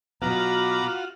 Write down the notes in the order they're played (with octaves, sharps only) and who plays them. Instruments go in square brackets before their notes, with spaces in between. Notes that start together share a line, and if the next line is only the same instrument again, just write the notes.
[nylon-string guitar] B2 F#3 B3 [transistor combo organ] F4 F#4 [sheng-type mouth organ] A#5 [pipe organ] B5 D6